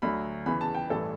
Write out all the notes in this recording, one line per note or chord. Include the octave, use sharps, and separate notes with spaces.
D2 D3 F#3 B5
E2 C#3 E3 B5
A5
G5
A1 G2 E3 A4